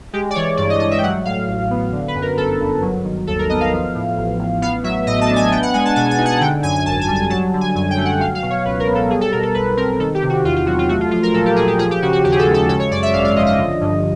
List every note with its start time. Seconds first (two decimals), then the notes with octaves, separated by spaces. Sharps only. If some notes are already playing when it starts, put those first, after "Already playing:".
0.13 G#3 G4
0.31 D5
0.35 E3 C#5
0.57 G2 D5
0.70 D#5
0.80 G2 D#5
0.91 E5
0.98 G5
1.03 F#3 F#5
1.25 A2 F5
1.48 A1
1.70 B3
1.92 D3
2.08 B4
2.15 F#2
2.22 A#4
2.37 G1 A4
2.60 G1
2.82 F#3
3.05 D#3
3.27 D#2 A4
3.39 A#4
3.49 B3 D#5
3.60 F5
3.72 F3
3.95 A2
4.17 A1
4.39 A1
4.62 B3 F5
4.84 F#3 E5
5.06 A2 D#5
5.21 A5
5.29 D4
5.36 G#5
5.52 B3 G5
5.62 F#5
5.74 G#3 G#5
5.85 A5
5.96 B2 G#5
6.11 G#5
6.18 D#4
6.26 F#5
6.41 D3 G5
6.63 F#2 G#5
6.76 G#5
6.86 G#1 A5
7.01 G#5
7.08 G3
7.16 G#5
7.30 F#3 A5
7.54 D3
7.61 G#5
7.75 F#2 G#5
7.91 G5
7.97 A3
8.05 F#5
8.20 F#3 F5
8.35 F5
8.42 B2
8.50 C#5
8.65 C#2 B4
8.80 A#4
8.88 B3
8.95 A4
9.10 G3 G#4
9.21 A4
9.32 B2 A#4
9.43 A4
9.54 B1 B4
9.77 C4 A#4
9.99 D#3 A4
10.14 G4
10.22 C3
10.29 F#4
10.44 E2 F4
10.56 F4
10.67 F#3 F#4
10.79 F4
10.89 A3 F#4
11.01 F4
11.11 F3 F4
11.23 A#4
11.34 A#2 A4
11.46 G4
11.56 A#2 G#4
11.68 G4
11.79 F3 G#4
11.91 G4
12.02 C#3 F#4
12.13 F#4
12.25 D#2 G4
12.32 G#4
12.39 A4
12.46 G#3
12.54 A4
12.69 C#3 A4
12.79 C#5
12.91 F#2 D5
13.03 E5
13.13 G#1 F5
13.25 F5
13.35 F3 D#5
13.47 D#5
13.58 D3
13.81 G2